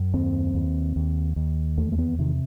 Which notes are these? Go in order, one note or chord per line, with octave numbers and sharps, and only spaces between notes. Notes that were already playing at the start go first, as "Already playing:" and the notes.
Already playing: F#2
D#2 C4
D#2
D#2
D#2
E2 A3
A3
B3
C3 D#3